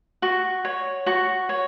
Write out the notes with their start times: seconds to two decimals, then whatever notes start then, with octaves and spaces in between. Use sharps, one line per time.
0.22 F#4 C#6
0.65 C#5
1.06 F#4 C#6
1.49 C#5